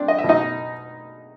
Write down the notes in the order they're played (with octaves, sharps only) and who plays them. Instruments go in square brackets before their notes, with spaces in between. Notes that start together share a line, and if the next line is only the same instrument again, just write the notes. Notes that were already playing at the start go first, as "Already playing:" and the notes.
Already playing: [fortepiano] C4 D4 D5
D#5
E5
B2
D#4 D#5